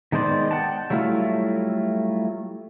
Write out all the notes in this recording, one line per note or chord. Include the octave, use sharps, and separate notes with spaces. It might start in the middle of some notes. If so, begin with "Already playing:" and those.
D#3 G#3 B3 C5 D5
F#5 G5 A5
F#3 G3 A3 E4 F4